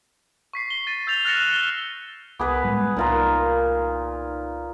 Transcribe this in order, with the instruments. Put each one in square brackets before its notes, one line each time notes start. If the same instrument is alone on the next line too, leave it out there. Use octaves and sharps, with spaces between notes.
[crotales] C#6 B6 C7
G7
A6 D#7
E6 G6 A6 F7
F6 F#6 A6 A#6 C#7 E7
F6 G7
[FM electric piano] C2 D6 [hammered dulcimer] B3 G#4 B4
[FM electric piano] A2 G3 G#3
[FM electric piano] C2 D#4 A#5 [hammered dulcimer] A#2 F4 A#4